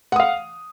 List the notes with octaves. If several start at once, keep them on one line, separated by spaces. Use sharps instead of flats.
F5 F#5 D#6